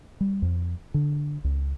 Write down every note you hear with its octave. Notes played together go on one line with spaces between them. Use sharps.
G3
F2
D3
C#2